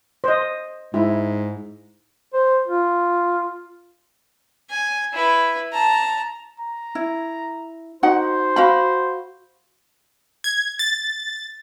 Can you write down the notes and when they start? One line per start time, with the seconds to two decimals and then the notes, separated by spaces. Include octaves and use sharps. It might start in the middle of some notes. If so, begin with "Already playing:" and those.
0.24 C5 D#5
0.94 G#2 E4
2.34 C5
2.67 F4
4.70 G#5
5.14 E4 B4
5.73 A5 A#5
6.60 A#5
6.95 E4
8.03 D#4 F#4 C5 F#5
8.56 F#4 F5 B5
10.44 G#6
10.79 A6